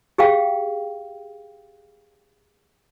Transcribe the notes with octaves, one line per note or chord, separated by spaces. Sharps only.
G4 G#4 F5 G5